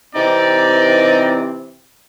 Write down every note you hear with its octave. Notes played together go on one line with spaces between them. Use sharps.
C3 E3 C4 D#4 D5